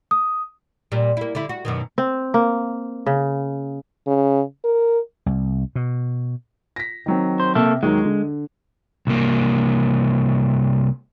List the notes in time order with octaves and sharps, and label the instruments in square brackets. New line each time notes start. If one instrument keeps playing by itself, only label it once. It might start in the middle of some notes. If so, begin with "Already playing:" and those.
[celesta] D#6
[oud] A#2 G3
A#3 E4
D3 E4
F#4
F#2 B2 D#3
[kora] C4
A#3
C#3
[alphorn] C#3
A#4
[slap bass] C2
B2
[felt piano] A#6 B6
D#3 F#3 C4
[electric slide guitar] C5
[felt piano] C3 [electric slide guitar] A#3 A4
[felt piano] D#2 D#3 F#3 [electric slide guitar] G#3
[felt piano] D3
[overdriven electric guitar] C2 A#3